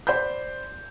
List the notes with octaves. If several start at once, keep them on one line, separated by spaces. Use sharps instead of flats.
C5 D5 B5 G6